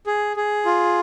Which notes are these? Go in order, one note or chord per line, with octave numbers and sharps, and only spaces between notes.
G#4
G#4
F4